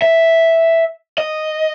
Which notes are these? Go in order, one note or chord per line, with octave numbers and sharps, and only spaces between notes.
E5
D#5